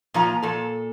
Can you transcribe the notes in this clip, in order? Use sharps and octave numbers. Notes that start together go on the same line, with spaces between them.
A#2 F3 A#5
A#2 A4